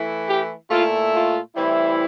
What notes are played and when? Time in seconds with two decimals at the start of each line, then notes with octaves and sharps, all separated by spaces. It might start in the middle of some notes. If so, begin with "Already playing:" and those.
Already playing: E3 A3 E4
0.27 G4
0.70 A#2 A3 E4 F4
1.13 F4
1.55 A2 E3 G3 C4 E4